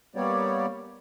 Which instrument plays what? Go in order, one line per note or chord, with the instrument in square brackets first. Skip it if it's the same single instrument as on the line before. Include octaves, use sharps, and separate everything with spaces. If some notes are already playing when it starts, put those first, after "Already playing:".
[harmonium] G3 A#3 B3 G4 C#5 D5